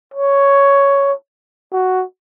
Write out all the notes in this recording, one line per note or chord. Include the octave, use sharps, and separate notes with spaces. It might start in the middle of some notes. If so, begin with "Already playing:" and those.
C#5
F#4